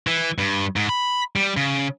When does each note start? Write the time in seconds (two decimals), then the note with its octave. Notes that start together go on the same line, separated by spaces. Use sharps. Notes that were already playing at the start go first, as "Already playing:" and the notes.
0.07 E3
0.38 G2
0.76 G#2
0.89 B5
1.36 G3
1.57 C#3